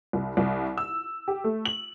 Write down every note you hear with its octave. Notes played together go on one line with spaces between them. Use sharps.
C2
C2
E6
G4
A3
F#7